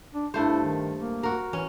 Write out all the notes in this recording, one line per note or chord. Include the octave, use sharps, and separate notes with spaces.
D4
G2 A3 E4 C5
D#3
A#3
F#4 A#4
E3 C#4